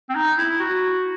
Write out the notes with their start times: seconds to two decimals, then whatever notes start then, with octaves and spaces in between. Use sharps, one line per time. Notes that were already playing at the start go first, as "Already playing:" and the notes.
0.09 C4
0.15 D#4
0.38 E4
0.60 F#4